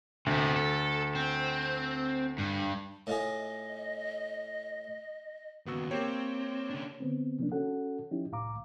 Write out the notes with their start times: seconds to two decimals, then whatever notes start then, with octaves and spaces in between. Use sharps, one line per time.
0.26 D2 C3 B3
0.56 A4
1.15 C4
2.38 G2
3.07 A2 F4 G#4 D#5
5.66 D#2 C#3 B3 F#4 E6
5.91 A#3 C4 G4 C#5
6.70 C#3 D4
7.00 D3 B3 C4
7.39 C3 F3 A#3 C#4 D4
7.52 C#4 F#4 A4 F#5
8.11 F3 C#4 D#4 E4 G4
8.32 C2 A2 F5 A#5 D6